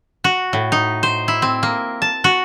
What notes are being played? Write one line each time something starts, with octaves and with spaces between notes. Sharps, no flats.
F#4
A2
D#4
C5
E4
C4
A#3
A5
F#4